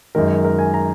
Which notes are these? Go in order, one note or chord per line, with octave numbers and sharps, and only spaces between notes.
F#2 D#3 G#3 A#4
A#4
G#5
A#5